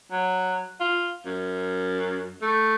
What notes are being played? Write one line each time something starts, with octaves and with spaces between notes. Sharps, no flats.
F#3
F4
F#2
A3